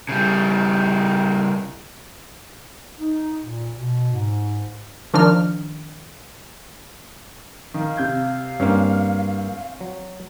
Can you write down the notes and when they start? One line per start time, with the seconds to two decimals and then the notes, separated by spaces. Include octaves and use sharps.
0.09 C#3 G3
3.00 D#4
3.41 A#2
3.75 B2
4.12 G#2
5.14 D#3 F3 D4 D#4 F6
7.74 D#3 F5
7.97 C3 G6 G#6
8.60 G2 A#3 C4 C#4
9.81 F#3